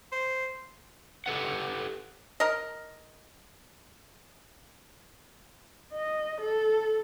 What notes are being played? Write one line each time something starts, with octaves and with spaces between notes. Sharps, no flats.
C5
G4 A4 B4 F#5
A#4 D#5
D#5
A4